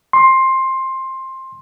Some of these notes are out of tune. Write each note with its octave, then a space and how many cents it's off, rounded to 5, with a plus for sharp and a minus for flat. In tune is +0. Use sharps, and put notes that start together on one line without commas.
C6 +15